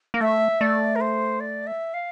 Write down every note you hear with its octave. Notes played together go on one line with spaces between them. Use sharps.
A#3
A3 E5
A3 D5
A#4
C5
D5
E5
F5